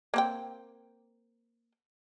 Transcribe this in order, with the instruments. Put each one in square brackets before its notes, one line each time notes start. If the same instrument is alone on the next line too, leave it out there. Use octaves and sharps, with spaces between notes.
[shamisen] A#3 C4 G5